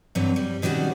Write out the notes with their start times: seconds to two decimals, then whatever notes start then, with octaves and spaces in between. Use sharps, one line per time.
0.15 G2 C3 E3 F#3
0.36 G3
0.62 B2 D#3 G3 C#4 F#4 G#4